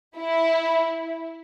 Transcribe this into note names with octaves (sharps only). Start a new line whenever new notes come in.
E4